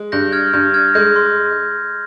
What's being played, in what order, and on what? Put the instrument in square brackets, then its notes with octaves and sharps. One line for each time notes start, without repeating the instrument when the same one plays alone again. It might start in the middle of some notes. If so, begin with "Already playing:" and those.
Already playing: [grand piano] G#3
[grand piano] G2 [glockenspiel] G6 A#6
[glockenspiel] F6 G#6
[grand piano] G2 [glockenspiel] G6
[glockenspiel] F6 G#6
[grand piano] G#3 [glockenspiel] G6 A#6
[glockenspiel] C6